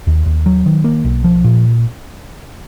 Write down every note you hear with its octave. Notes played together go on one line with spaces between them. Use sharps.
D#2
D#2
F#3
D#3
A#3
B1
F3
A#2